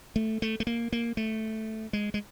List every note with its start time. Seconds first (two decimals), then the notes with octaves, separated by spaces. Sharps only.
0.16 A3
0.42 A3
0.60 A3
0.67 A#3
0.92 A#3
1.17 A3
1.93 G#3
2.14 G#3